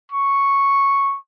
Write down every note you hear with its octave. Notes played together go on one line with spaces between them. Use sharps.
C#6